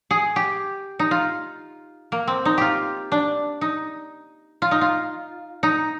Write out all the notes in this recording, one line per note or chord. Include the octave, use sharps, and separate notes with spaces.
G#4
G4
D#4
F4
A#3
C4
D#4
F4 G4
D4
D#4
F4
D#4
F4
D#4